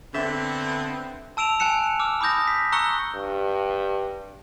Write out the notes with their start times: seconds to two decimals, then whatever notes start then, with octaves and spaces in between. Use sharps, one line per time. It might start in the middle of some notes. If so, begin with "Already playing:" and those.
0.14 D3 B3 C4 E5
1.37 A5 E6 D7 E7 F7
1.60 G#5 A5 F#6 C#7 E7
1.99 D6 E6 F6
2.21 B5 D6 D#6 G6 A#6
2.47 B6
2.72 A#5 C#6 E6 F#6 C#7 G7
3.15 G2